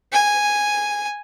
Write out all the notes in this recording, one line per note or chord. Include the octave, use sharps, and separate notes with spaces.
G#5